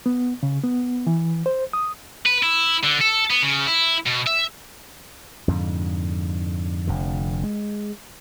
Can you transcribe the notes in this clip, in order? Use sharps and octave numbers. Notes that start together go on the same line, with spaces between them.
B3
C#3
B3
E3
C5
D#6
B4
E4
D3
A4
B3
C#3
E4
B2
E5
F2 G#2 D3
F1 F2 D3
G#3